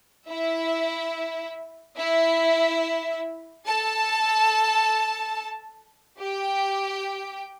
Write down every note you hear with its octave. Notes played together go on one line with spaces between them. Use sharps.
E4 E5
E4 E5
A4 A5
G4 G5